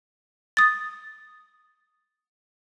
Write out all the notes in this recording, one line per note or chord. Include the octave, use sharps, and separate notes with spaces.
D#6 A6